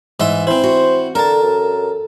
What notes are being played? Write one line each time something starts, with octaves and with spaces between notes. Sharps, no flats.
G#2 E3 E5 C6
C4 E4 C5
F#4
D3 A4 A#4 A5
F#2